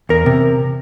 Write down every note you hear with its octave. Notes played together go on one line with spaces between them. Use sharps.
E2 A#4
C3